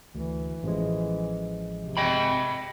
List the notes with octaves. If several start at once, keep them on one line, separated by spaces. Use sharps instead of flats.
D2 E3
A1 F3 G#3
C3
D#5 G5 B5